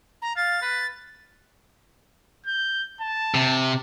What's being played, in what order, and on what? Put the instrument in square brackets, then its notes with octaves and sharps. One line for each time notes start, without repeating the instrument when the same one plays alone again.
[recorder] A#5
[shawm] F5 [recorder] A6
[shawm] B4
[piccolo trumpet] G6
A5
[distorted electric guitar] C3